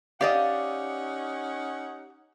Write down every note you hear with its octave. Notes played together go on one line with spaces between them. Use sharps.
C#4 D#4 G4 D5 D#5 F5 F#5